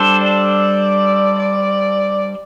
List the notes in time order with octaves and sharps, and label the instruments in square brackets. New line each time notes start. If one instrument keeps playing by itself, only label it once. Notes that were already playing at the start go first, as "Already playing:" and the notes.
Already playing: [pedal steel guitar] G3 D4 A4 C5
[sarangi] D5
D5